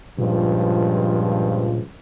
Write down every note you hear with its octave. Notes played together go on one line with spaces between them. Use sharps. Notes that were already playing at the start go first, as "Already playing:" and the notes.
C#2 G2 A#2 F3